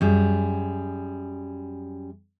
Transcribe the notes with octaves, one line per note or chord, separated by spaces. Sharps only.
F#2 G3 G#4